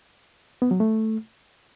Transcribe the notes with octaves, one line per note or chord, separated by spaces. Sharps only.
B3
F#3
A3